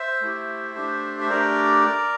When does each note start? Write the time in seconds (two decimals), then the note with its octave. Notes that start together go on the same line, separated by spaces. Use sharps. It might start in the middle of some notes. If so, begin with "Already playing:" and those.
Already playing: C5 E5
0.22 A3 E4 G4
0.75 A3 D4 G4
1.20 E5
1.30 A3 D4 G4 A#4 D5